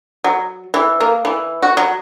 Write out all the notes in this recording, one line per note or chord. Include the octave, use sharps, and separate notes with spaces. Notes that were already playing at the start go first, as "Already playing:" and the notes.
F#3
E3
A#3
E3
F#4
F#3